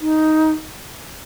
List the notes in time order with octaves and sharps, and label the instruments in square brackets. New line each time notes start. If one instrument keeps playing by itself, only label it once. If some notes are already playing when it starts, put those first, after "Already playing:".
[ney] D#4